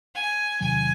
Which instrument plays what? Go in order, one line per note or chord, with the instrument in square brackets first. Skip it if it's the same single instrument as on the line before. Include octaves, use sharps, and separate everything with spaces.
[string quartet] G#5
[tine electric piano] E2 C3 D#3 F#3 [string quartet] G#5